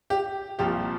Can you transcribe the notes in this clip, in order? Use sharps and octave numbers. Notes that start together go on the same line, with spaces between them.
G4
C2 A#2 F3 G4